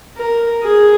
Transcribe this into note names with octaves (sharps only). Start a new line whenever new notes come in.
A#4
G#4